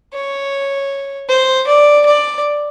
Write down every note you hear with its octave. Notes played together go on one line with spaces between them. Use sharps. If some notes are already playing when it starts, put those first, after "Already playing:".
C#5
C5
D5
D5